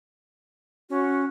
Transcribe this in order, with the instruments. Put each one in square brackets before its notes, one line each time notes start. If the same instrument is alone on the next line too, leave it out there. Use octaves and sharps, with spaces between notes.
[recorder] C#4 [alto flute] F#4